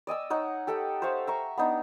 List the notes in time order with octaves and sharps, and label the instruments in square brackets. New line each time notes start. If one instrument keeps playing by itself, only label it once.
[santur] D5 D#5 G#5 E6
D#4 C#5 F#5
G4 A4 F#5 G5
C5 E5 F5 C#6
E5 A#5 C#6
B3 D4 D#4